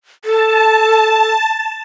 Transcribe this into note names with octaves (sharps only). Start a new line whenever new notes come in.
A4 A5